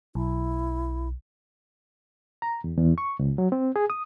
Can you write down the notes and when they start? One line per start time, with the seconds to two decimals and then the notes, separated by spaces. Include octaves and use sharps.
0.15 B1 E4
2.42 A#5
2.64 E2
2.78 E2
2.98 C#6
3.19 C#2
3.38 F#3
3.52 C4
3.76 G#4
3.90 D#6